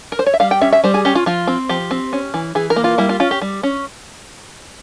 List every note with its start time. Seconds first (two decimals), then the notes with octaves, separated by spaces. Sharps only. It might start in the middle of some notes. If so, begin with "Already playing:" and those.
0.12 A#4
0.19 C5
0.26 C#5
0.34 E5
0.40 G3 F5
0.51 G5
0.61 C#4 E5
0.73 E5
0.84 G3 C5
0.94 G#4
1.05 C#4 G4
1.15 F4
1.26 F3 F4
1.47 C4
1.69 F3 G4
1.91 C4
2.13 C#4
2.34 E3
2.55 E3 G#4
2.70 A#4
2.76 A#3
2.84 F4
2.98 G3 E4
3.09 F4
3.20 C#4 F4
3.31 G4
3.42 G3
3.63 C#4